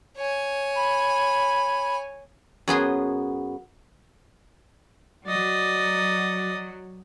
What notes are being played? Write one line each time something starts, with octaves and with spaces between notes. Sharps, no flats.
C#5 G#5
B5
F#2 B3 G#4 C6
F#3 D5 D#5